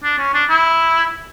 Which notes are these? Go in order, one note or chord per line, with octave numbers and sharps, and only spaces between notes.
D4
C#4
D4
E4